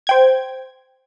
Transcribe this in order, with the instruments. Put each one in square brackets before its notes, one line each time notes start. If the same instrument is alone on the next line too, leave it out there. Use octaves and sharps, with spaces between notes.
[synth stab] C5 G5 G#6